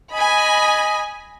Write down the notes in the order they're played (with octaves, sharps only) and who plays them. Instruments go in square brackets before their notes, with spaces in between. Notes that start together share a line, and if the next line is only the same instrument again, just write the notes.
[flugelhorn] D#5 [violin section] G#5 B5